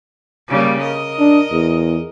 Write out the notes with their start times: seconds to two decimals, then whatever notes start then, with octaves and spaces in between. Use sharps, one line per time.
0.48 C#3 G3 A#3
0.81 A#4 D#5
1.19 D4
1.52 E2